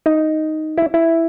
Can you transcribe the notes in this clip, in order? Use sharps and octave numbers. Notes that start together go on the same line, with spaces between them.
D#4
E4
E4